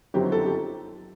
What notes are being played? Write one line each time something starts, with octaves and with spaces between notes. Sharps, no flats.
G1 F#2 D#3 F#3 C4 G4
A4
G4